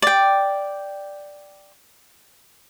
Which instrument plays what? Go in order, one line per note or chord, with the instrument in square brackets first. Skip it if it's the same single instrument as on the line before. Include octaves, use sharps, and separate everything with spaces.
[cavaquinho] D5 G5